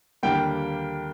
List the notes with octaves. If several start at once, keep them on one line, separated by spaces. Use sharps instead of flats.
D#2 D3 G3 A#3 G5